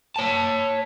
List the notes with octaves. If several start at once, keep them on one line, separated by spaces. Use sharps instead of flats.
C#5 A5